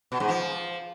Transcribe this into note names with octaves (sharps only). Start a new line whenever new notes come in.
B2
G#2
F3